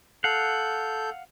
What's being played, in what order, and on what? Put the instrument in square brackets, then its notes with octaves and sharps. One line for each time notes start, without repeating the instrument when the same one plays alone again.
[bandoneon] A4 G6 [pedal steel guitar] F5 F#5